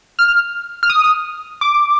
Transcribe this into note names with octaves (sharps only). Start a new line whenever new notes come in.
F6
F6
D#6
D6